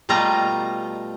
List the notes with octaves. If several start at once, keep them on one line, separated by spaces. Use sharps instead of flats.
B2 G3 A3 F4 D#5 A#5